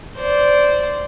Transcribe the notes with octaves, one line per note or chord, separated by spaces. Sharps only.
C5 D5